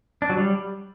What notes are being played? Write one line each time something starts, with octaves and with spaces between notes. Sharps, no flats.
D4
F#3
G3